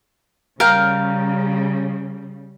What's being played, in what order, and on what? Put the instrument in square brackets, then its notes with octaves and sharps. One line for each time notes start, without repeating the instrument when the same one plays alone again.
[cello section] C#3 G3 [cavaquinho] A#4 F5 G5